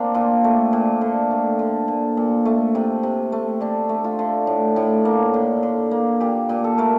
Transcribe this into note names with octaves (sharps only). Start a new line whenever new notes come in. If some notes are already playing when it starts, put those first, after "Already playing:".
Already playing: A#3 C4 D4
A#2 F4
A3
A#2
D3
A3
D3
A#2
A#2
A3
C3
C3
A3
D3 D4
A3
F4
D3
A2
A2
A#3
D3
D3
A#3
A#2 G4
A#2
A4
A3 A#4